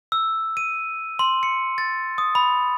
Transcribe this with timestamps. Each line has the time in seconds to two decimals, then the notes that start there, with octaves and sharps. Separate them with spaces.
0.12 E6
0.57 D#7
1.19 C6
1.43 C#7
1.78 A6
2.18 D#6
2.35 B5